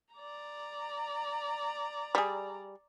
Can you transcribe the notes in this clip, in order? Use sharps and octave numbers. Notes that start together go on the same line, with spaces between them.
D5 A#5
G3 G#4